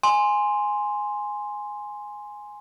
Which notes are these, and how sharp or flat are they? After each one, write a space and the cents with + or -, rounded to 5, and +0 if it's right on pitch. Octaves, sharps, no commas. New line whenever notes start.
G#5 +0 C6 +0